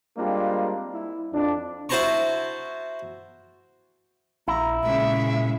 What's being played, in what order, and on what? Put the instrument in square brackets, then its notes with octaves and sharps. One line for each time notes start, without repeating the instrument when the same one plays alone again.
[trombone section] G3 G#3 A#3 C4 D4 F4
E4
F2 D4
[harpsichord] E4 F#4 C5 A5 A#5 C#6
[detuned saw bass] A#1 [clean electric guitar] E4 [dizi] A#5
[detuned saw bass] A#2 [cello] C#3 G#3 [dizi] E5